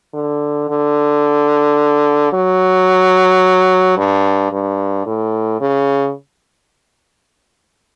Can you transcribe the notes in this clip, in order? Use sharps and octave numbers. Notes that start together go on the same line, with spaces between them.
D3
D3
F#3
G2
G2
A2
C#3